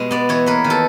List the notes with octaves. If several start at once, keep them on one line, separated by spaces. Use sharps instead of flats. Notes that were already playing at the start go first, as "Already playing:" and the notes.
Already playing: B2 G#3
B3 D5
E3 C#5
A#3 B4
D#3
A4